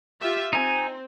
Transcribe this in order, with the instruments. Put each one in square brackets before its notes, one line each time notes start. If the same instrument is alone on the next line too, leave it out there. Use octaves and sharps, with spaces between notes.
[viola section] F4 G4 E5
[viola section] C4 [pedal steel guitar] D#4 G#5